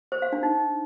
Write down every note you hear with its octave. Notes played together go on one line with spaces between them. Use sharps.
C5
F5
D4
D#4